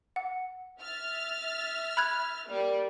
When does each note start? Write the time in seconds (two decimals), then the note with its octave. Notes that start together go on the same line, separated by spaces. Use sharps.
0.16 F#5
0.80 E5 F6 A6
1.97 B5 F#6 G#6
2.48 G3 A#3